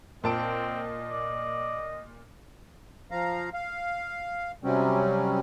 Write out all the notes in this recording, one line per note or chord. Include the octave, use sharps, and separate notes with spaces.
A#2 C4 D#5 A5 D7
D5
F3 F5 A#5
F5
C3 F#3 G3 C4 C#4